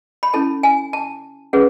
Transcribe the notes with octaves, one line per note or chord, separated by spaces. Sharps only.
B5
C#4 E4 A4 A5
G#5
A5
C#4 G#4 B4 F#5